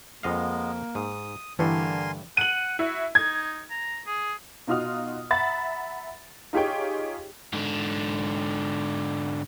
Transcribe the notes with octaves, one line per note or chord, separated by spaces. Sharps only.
F2 G#3 A#3 B3 D#5 F5
G#2 D#6
G2 D3 E3 A3 A#4 G#5 C6
F#5 D#7 F#7
E4 F#4
D#4 G#6
A#5
G#4
B2 D#4 F4 F#4 D#6 F6
E5 F#5 A#5 B5 A6
D#4 F4 G4 G#4 C#5 G5
G#2 D3